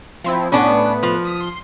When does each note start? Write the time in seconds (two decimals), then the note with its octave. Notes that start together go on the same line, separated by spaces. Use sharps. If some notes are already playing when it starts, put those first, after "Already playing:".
0.24 F3 C4 E4
0.52 A2 B3 C#4 D4
1.03 F3
1.25 D#6 B6
1.41 C6